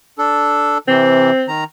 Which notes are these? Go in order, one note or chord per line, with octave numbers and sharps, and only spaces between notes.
D4 A4
C3 E3 C4
D#3 A#5